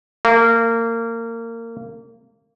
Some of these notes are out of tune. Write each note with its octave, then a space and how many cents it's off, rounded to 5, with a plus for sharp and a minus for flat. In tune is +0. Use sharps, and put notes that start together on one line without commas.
A#3 -25